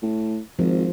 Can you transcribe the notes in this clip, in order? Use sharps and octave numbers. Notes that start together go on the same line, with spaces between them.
A2
G#1 F3